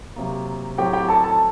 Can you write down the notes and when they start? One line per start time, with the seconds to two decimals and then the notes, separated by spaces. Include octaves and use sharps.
0.16 C3 F#3 A#3
0.78 A2 F#3 C4 G4 G5
0.93 G4 G5
1.08 A4 A5
1.24 A4 A5